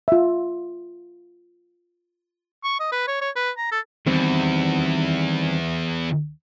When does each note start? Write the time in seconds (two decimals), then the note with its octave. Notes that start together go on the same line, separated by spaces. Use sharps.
0.08 F4 E5
2.64 C#6
2.80 D#5
2.92 B4
3.08 C#5
3.21 C#5
3.36 B4
3.58 A#5
3.72 A4
4.06 E2 D#3 G3 C4